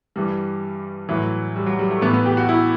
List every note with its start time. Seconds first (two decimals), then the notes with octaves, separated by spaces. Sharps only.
0.16 G2 E3 G3
1.09 A2 E3 F#3
1.56 G3
1.66 F#3
1.79 G3
1.91 A3
2.01 A2 E3 B3
2.13 B3
2.26 G4
2.37 F#4
2.49 E4